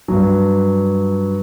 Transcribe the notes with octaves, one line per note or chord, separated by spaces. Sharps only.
G2 F#3